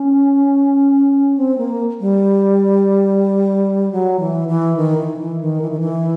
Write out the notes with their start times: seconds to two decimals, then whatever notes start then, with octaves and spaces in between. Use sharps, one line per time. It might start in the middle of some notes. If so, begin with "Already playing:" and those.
Already playing: C#4
1.37 C4
1.58 A#3
2.01 G3
3.92 F#3
4.20 E3
4.48 E3
4.77 D#3
4.98 E3
5.14 D#3
5.19 E3
5.41 D#3
5.62 E3
5.71 D#3
5.80 E3